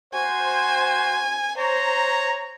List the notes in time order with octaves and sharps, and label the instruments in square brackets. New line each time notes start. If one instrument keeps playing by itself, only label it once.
[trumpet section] F#4 C5 [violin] G#5
[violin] C5 [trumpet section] C#5 A#5